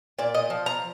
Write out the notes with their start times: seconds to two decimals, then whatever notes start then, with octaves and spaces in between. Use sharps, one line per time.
0.19 A#2 D5
0.34 D#5
0.50 F3
0.66 A#5